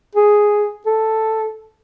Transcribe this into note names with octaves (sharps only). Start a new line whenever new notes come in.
G#4
A4